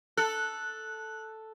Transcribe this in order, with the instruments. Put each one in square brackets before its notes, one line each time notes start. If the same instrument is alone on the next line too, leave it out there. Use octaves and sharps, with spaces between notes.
[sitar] A4 [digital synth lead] F#6